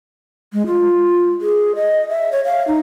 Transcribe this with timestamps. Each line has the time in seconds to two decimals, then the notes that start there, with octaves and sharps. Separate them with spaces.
0.53 G#3
0.67 F4
1.41 G#4
1.76 D#5
2.09 E5
2.32 C#5
2.45 F5
2.67 D#4